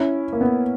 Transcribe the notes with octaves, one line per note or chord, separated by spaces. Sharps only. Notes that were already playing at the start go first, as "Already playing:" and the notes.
Already playing: C#4 E4
A#3
B3